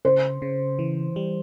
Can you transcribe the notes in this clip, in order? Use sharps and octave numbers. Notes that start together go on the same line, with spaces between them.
C#3 C5
C#3
E3
G3